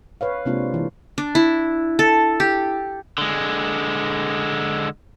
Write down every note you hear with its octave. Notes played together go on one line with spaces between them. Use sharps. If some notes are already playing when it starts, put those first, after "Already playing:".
B4 C#5 F5
C3 G#3 A#3 C4 D4 F4
E3
D4
E4
A4
G4
D3 G#3